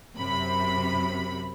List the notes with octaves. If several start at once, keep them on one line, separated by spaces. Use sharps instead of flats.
F#2 C3 B5